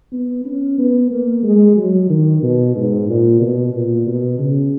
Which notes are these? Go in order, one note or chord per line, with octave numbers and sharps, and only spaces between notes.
B3
C#4
B3
A#3
G#3
F#3
D#3
B2
G#2
A#2
B2
A#2
B2
C#3